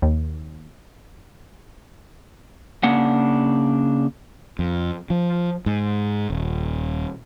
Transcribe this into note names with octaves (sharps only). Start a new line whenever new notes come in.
D#2
C#3 A#3 D4 F#5
F2
F3
G#2
D#1